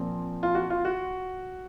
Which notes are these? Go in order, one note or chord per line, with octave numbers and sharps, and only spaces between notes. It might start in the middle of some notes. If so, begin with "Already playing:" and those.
Already playing: A#2 F3 C4
F4
F#4
F4
F#4